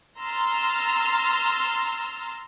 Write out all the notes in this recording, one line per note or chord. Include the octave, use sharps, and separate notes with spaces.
A#5 C6 E6 F6 A6